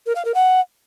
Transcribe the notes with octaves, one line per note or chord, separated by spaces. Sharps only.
A#4
F5
A#4
F#5